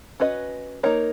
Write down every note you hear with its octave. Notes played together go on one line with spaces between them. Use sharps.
C#4 F#4 B4 D#5
A#3 D#4 A#4 C#5